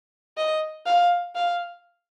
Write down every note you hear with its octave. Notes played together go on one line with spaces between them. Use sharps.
D#5
F5
F5